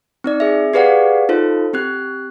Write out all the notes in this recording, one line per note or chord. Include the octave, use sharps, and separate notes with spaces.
C4 D#4 D5
G#4 E5
G4 G#4 B4 D5 F5 F#5
D#4 F4 A4 C5
C4 G4 F#6